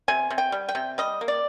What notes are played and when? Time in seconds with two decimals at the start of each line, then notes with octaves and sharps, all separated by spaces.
0.08 C3 G#5
0.31 C3
0.38 G5
0.52 G3
0.69 G5
0.75 C3
0.98 G3 D#5
1.21 A#3
1.28 D5